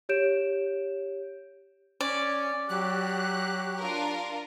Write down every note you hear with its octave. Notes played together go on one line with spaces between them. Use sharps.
G4 C#5 G6 D7 E7
C#4 D5
F#3 G4 F#6
D4 F4 A#4